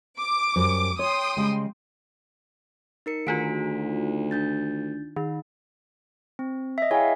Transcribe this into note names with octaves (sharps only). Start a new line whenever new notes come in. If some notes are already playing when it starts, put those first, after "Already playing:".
D6
F#2 G3 C5
C#5 G5 C6 D#6
C#3 G3 G#3
D#4 A#4 C#7
D2 D#3 D#4 F4 F#4 B6 D7
D4 G6 A6
D#3 D#4
C4
D#5 E5
E4 G#4 C#5 F5 G5